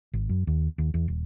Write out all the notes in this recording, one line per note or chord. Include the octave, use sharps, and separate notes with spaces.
G#1
F#2
D#2
D#2
E2
D#1